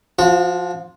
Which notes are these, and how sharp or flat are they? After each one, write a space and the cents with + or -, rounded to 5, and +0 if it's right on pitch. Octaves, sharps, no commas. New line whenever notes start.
F3 +0 F#4 -35